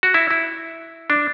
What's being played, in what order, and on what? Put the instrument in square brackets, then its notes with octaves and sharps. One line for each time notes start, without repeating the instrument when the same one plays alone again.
[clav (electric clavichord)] F#4
E4
E4
D4